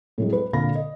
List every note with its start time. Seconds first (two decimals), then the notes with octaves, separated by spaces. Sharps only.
0.18 A2 F#3 G#3
0.33 B4
0.53 A#2 D3 A#3 F5 B5 A#6
0.75 D#5